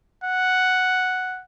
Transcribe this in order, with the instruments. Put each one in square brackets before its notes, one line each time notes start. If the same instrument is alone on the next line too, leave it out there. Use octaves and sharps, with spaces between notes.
[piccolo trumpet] F#5